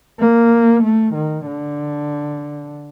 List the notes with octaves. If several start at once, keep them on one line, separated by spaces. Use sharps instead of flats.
A#3
A3
D#3
D3